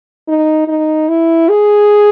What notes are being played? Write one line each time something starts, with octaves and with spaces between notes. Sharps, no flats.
D#4
D#4
E4
G#4